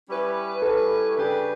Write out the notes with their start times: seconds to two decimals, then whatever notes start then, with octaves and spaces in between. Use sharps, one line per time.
0.09 G3 C#4 E4 B4
0.62 G3 C#4 E4 A4 B4
1.16 C#3 G3 D4 G4 B4